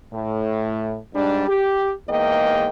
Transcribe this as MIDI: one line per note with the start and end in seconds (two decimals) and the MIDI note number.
0.12 0.98 45
1.14 1.48 44
1.14 1.48 55
1.14 1.48 62
1.48 1.92 67
2.09 2.69 40
2.09 2.69 44
2.09 2.69 58
2.09 2.69 75
2.09 2.69 79